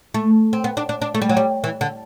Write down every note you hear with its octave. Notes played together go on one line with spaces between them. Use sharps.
A3
C4
B3
D4
D4
D4
A3
G3
F#3
G3
E3
D3